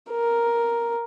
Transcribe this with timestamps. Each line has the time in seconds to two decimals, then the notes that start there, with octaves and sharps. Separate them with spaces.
0.11 A#4